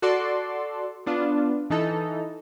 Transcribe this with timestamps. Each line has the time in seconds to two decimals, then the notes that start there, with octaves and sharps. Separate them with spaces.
0.02 F#4 A4 D5 C6
1.06 B3 D4 F4
1.70 E3 D#4 A4